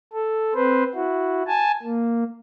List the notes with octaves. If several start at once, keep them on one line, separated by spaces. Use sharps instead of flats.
A4
C4 B4 C5
E4 F#4
G#5 A5
A#3